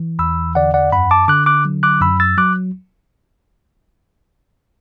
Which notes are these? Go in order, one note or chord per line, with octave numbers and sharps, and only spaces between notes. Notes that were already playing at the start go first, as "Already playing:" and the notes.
Already playing: E3
E2 B5 E6
D3 D5 F#5
D5 F#5
F#2 F#5 B5
A5 D6
D3 D6 F#6
D6 F#6
F#3
D6 F#6
F#2 B5 E6
E6 A6
F#3 D6 F#6